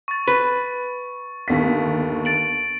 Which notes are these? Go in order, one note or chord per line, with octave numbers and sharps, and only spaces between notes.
C#6 A6
B4
G1 D#2 B6
A6 D7 F#7